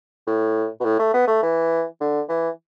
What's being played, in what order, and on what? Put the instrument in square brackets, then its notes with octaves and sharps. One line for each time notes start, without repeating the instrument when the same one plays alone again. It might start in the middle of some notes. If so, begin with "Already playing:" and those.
[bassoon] A2
B2
A2
A3
B3
A3
E3
D3
E3